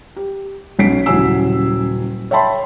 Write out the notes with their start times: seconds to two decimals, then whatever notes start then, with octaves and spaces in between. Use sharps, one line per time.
0.16 G4
0.79 B1 C#4 B6 C7 D7
1.06 D#1 C#3 F#3 E4 G#5 E6
2.31 C#5 E5 G5 A5 B5 C6